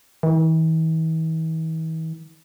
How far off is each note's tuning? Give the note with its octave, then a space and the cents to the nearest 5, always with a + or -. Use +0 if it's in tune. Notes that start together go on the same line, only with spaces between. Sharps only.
E3 -45